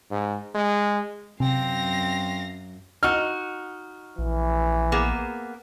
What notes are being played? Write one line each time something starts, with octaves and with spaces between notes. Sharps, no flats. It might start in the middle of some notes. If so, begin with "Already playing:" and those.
G#2
G#3
F#2 C3 C4 F5 A#6
D#4 F#4 F6
A#1 E3
A#3 B3 G#4